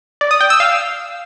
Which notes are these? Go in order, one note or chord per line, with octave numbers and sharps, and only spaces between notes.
D5
D#6
G5
E6
F5